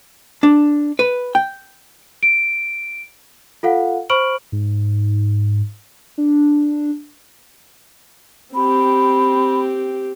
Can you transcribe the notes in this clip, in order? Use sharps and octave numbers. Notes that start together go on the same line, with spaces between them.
D4
B4
G5
D7
F4 A4 F5 F#5
C5 B5 C#6 F6 D7 F#7
G#2
D4
C4 G4 B5